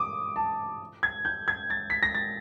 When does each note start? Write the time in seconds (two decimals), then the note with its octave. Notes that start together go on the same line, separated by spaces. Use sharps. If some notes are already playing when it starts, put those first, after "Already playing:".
Already playing: D6 D#6
0.36 A5
1.03 G#6
1.25 G6
1.48 G#6
1.70 A6
1.90 B6
2.03 A#6
2.15 A6